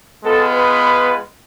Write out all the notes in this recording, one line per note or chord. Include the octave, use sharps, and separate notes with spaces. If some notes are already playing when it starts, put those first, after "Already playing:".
G#3 B3 F4 A4
B4